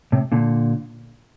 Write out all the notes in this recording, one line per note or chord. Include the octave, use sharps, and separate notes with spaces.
A2 C3
A#2 D3